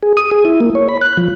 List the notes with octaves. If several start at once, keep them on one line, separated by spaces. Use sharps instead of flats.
G#4
D#6
G#4
E4
A#3
C#5
B5
F#6
F3